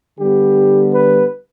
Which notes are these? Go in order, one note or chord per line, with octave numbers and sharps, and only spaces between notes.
D3 G3 B3 G4
B4